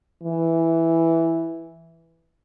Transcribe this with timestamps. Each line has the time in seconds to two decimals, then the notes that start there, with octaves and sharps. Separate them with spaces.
0.22 E3